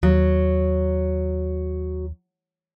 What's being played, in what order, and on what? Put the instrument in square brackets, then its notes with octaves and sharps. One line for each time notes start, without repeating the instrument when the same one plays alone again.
[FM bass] D#2 [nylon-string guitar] F#3